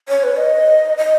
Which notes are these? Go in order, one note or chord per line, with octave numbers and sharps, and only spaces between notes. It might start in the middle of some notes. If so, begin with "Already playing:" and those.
C#5
B4
D#5
D#5